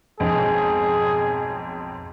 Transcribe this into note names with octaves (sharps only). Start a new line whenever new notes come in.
B1 F2 G#2 G#4